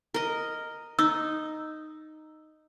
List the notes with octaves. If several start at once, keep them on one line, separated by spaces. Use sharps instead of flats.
A#4 D#5
D#4 E6